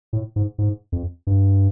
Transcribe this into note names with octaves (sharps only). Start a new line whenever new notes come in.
A2
G#2
G#2
F2
G2